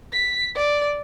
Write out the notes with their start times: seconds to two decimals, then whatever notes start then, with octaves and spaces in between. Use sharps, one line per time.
0.13 B6
0.55 D5